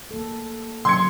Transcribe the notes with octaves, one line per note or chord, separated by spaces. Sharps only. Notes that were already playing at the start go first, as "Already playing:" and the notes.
A#3 A4
C#3 F#3 C#4 C6 G#6 C#7